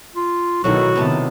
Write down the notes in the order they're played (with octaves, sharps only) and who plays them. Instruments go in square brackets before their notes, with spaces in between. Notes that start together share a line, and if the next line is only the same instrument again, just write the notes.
[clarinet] F4
[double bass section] B1 B2 D#3 [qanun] F#3 A3 E4 [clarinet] F#4
[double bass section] C3 D#3 [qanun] B3 A5